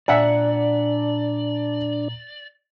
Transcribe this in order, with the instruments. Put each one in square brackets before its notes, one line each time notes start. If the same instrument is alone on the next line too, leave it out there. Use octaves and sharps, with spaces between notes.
[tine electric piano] A#2 A#5 [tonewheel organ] D4 [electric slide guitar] D5 [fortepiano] E5 F#5 G#5